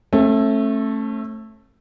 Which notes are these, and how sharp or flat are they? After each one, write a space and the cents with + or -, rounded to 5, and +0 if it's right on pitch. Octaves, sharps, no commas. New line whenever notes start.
A3 +0 C#4 -45